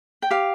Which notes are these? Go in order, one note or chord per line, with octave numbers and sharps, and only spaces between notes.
G5
G4 F5